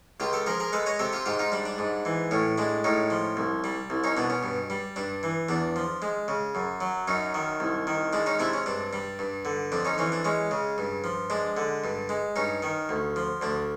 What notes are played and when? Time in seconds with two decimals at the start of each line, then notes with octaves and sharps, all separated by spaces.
0.20 C#2 F4 G4
0.33 G4 A4
0.46 F3 G#4 A#4
0.60 G#4 A#4
0.73 G#3 A4 B4
0.86 C#5 D#5
0.99 C3 G4 A4
1.13 F4 G4
1.26 G#2 F4 G4
1.39 D#4 F4
1.52 G3 D4
1.65 D4
1.78 G#2
2.05 E3
2.31 A2 C#4
2.58 G#3 D4
2.84 A2 C#4 D#4
3.10 F3
3.37 C2
3.64 G3
3.90 C2
4.04 C#4 D#4
4.17 B2 D4
4.30 C#4
4.43 G2
4.70 G3
4.96 G2 D4
5.23 E3
5.49 E2 D4
5.76 F3
6.02 G#3
6.28 C#3
6.55 F#2
6.81 F#3
7.08 F#2 C#4 D#4
7.34 D#3
7.60 C2
7.87 D#3
8.13 G#3 D4
8.26 C#4 D#4
8.39 C3 D4 E4
8.53 C#4
8.66 G2 D4
8.93 G3
9.19 G2
9.45 D3
9.72 F2 D4
9.85 C#4 D#4
9.98 E3 C#4
10.12 D4
10.25 G#3 C#4
10.51 C#3
10.78 G2
11.04 F3
11.30 G#3 D4
11.57 D3
11.84 G2
12.09 G#3
12.36 G2 C#4 D#4
12.63 D#3
12.89 D2
13.16 F3
13.42 D2 D4